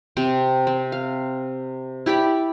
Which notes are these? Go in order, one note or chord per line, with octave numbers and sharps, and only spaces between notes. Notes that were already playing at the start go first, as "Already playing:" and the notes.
C3 C4
C4
F5
E4 G4 D5 B5